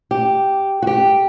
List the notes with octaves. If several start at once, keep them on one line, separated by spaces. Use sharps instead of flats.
G4
F#4
G4